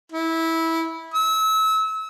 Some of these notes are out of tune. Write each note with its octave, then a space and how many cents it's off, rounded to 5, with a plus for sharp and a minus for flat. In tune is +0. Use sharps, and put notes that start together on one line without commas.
E4 -15
E6 -30